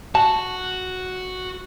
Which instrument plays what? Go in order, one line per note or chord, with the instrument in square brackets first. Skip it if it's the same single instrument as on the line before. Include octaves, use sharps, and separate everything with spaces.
[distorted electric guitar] F#4 [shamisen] A5